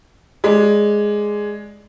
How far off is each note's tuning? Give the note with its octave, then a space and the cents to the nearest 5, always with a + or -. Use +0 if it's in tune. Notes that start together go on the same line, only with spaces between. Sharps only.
G#3 +0 D5 +0